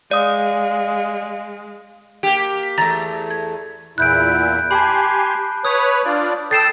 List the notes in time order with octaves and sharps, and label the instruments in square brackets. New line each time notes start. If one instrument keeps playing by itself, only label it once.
[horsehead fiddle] G#3 [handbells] D5 D#6 [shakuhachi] F5
[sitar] A#3 G4 [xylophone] G5
[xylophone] B6
[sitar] E2 A3 [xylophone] A#5 A6 A#6
[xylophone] G#6
[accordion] E2 A#2 E4 [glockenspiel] F#6 G6 D7
[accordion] G4 G#5 C6 [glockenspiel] A5 B5
[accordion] B4 C#5 [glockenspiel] D#6
[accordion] D4 F4 D5
[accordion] A4 G5 D#6 [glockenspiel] A6 C7 E7